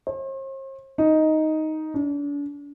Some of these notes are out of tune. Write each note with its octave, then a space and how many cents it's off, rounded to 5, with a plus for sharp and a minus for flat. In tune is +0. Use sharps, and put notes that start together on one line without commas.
C5 +45
D#4 +5
D4 -40